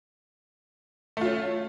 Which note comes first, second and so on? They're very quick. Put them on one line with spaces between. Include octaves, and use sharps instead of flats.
A3 F4 C#4